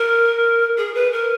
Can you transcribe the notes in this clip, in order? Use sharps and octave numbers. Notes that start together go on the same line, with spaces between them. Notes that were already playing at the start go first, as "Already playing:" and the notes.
Already playing: A#4
G#4
B4
A#4